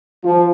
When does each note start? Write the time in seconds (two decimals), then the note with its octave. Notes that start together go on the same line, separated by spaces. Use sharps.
0.23 F3